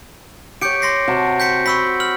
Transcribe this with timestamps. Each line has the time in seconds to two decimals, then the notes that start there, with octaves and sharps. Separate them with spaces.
0.61 G4 C#5 G6 C#7 D7
0.82 C6 A#6 C7
1.08 C3 F#4 A5
1.40 G6 B6 C#7
1.66 B5 C#6 E6 B6
2.00 F6 F#7